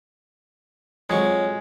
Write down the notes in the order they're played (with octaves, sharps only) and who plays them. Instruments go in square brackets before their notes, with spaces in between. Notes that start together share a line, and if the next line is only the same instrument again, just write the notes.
[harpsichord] F2 F#3 C#6 [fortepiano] G#3